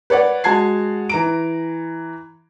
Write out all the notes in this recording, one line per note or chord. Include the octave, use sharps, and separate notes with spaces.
B4 C#5 D5 F#5
G#3 F#4 A5 G#6 C7
E3 A#5 D7